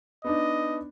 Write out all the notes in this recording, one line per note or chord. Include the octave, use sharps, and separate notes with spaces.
B3 D4 D#4 D#5